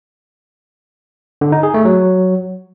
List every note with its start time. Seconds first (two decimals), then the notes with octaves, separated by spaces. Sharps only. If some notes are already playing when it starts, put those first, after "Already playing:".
1.41 D3
1.52 D#4
1.63 G#4
1.74 A3
1.85 F#3